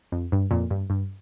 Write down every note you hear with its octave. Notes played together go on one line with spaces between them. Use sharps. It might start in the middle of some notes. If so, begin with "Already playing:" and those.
F2
G2
F2 A#2
G2
G2